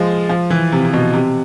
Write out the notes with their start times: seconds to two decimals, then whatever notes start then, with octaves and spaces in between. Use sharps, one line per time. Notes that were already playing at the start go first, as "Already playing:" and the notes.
Already playing: F3 G#3
0.29 F3
0.50 E3
0.72 C3
0.85 C3
0.93 B2
1.13 C3